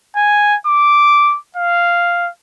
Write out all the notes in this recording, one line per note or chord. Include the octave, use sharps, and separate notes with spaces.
G#5
D6
F5